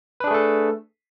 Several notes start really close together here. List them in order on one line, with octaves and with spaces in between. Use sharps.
B4 D4 G#4 A3 A4